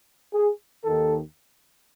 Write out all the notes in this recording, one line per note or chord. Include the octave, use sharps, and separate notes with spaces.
G#4
D#2 D#3 A4